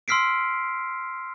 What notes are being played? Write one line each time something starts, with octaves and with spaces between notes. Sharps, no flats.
C6 E6 F6 B6 C7 D7